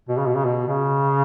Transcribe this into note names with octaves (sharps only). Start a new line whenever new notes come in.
B2
C#3
B2
C#3
B2
C#3